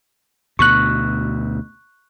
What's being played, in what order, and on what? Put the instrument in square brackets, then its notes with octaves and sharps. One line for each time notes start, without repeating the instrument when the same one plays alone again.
[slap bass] D2 B2 [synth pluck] C#6 F#6